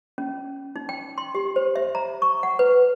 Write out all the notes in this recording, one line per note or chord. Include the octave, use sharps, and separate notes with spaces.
C#4
D#4
G5
C6
G4
C5
E5
A#5
C#6
F#5
B4